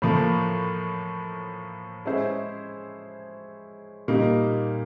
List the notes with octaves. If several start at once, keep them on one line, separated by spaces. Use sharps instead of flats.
A2 F3 A#3
G#3 C#4 E4 G#4 C5
A#2 G3 A#3 D#4